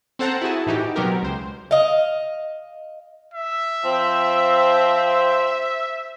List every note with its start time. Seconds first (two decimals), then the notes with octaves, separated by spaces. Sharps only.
0.19 C4 A4 C5 F#5 A5 A#5
0.41 E4 F#4 G#4 A5
0.66 A2 E3 D#4 F#4 G4
0.96 B2 F#3 B3 C4 G4 A#4
1.22 C#2 C5
1.71 D#5 F5
3.34 E5
3.84 F3 C4 C5